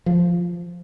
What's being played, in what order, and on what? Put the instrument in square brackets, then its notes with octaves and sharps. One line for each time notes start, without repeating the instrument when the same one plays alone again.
[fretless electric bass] F3